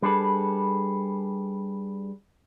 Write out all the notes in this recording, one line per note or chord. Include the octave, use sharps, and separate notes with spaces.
G3 D4 G#4 A4 B4